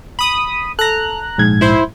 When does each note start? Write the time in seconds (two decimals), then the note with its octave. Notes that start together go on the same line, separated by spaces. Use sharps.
0.19 B5 D#6
0.79 A4 A#5 F#6
1.38 A#1 G#2 G#6
1.61 E4 C5